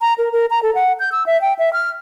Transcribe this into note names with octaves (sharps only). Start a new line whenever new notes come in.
A#5
A#4
A#4
A#5
A4
F#5
G6
E6
E5
G5
E5
F6